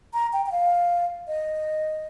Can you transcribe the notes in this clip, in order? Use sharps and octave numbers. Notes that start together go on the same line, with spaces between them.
A#5
G5
G5
F5
D#5